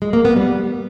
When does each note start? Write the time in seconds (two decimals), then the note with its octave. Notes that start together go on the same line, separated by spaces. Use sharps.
0.02 G#3
0.13 A#3
0.25 B3
0.36 G3